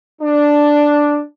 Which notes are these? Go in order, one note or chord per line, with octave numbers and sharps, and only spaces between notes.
D4